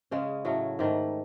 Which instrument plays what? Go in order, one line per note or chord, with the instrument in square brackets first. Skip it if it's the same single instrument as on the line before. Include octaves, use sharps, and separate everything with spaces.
[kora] C#3 G#3 C#4 G#4
A2 F#3 A3 C#4
G#2 D#3 A3